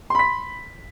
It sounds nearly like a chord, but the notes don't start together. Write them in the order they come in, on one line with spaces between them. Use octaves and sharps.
C6 B5 B6